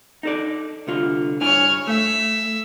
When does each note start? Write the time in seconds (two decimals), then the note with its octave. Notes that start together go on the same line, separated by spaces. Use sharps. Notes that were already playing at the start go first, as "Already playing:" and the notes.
0.23 D#4 A4 D5
0.87 C2 D3 F4
1.41 G2 E4 C#5 G#5 F6
1.87 A3 E5